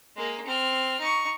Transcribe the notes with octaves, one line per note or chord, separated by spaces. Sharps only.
G#3 A#3
C4 F6
D#4 C#6